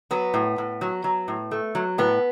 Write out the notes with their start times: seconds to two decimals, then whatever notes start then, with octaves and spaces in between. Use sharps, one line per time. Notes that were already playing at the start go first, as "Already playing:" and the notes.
0.11 F#3 B3
0.34 A2
0.58 A2
0.81 F#3
1.04 F#3
1.28 A2
1.51 A3
1.75 F#3
1.98 A2 B3